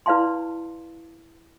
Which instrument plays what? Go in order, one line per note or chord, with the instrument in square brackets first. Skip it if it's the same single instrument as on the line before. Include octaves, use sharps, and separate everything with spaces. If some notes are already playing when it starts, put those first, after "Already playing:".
[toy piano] E4 B4 D5 F5 A5 C6